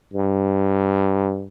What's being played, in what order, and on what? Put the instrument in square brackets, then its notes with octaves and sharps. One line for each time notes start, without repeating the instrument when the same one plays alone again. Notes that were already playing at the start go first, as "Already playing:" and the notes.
[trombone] G2